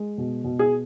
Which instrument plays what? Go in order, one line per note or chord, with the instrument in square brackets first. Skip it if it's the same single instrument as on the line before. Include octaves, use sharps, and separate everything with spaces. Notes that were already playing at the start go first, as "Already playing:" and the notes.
Already playing: [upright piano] G#3
B2
B2
G#4